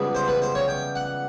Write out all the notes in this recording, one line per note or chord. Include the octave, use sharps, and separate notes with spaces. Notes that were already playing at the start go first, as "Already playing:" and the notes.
Already playing: C#2 C#3 E3 G3 B3
C5
B4
C5
C#5
G5
F#5